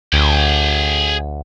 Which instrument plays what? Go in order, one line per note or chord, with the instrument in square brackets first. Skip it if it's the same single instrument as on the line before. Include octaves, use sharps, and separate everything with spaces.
[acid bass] D2 [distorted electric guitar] G#4 G5